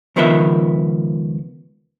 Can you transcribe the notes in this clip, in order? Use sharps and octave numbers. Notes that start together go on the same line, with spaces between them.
C#2 D#3 F3 B3 A#4 E5